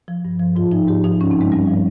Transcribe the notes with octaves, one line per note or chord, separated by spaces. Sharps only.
F3
G2
F3
G#2 F4
F3 D#4
G#2 G4
F3 D#4
G2 C#4
C4
F3 G#3
G2 G3
F3